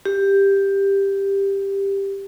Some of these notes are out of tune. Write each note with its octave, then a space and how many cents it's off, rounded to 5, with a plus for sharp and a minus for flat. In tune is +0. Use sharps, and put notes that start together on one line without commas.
G4 +10